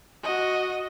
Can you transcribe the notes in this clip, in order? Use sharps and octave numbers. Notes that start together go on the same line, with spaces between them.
F#4 D#5